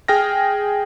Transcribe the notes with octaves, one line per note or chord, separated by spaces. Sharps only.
G#4 G5 F6 A#6